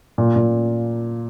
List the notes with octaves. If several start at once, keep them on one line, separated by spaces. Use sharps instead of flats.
A#2
A#2